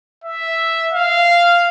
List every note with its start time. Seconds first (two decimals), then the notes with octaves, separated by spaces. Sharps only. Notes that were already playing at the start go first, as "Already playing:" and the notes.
0.24 E5
0.92 F5